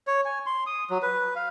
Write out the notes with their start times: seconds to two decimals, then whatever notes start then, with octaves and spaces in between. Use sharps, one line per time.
0.07 C#5
0.25 G#5
0.46 C6
0.66 D#6
0.90 F#3
1.02 B4
1.36 F5